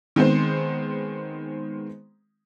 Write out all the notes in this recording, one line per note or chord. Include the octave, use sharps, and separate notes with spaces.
D#3 G#3 B3 C4 C5